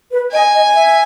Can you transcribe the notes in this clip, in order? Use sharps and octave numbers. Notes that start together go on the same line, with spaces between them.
B4
D#5 G#5
D#5
E5